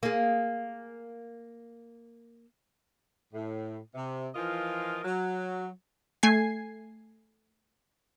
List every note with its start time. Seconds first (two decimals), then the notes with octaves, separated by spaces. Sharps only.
0.03 A#3 G#4
3.32 A2
3.94 C3
4.33 E3 F3 F4 A#4 D#5
5.03 F#3
6.23 A3 G#5 G#6 C7